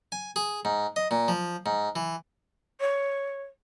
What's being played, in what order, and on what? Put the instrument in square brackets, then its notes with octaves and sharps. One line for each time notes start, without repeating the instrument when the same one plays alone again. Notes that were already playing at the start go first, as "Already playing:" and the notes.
[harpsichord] G#5
G#4
G#2
D#5
A#2
F3
G#2
E3
[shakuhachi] C#5